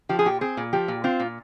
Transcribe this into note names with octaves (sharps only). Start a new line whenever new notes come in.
F3 G4
G#4
A#2 G4
C4 G#4
A#2
F3 G4
A#2
C4 F4
A#2